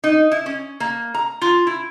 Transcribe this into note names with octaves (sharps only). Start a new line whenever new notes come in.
D#4
E4
C#4
A#3
A#5
F4
E4